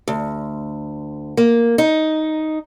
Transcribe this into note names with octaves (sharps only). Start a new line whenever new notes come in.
D2
A#3
D#4